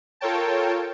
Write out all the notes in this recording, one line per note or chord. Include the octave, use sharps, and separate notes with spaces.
F4 A4 A#4 C#5 G5 A5